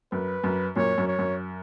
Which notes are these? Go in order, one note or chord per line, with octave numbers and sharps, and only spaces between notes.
F#2 B4
F#2
F#2 A#2 C#5
F#2
C#5
F#2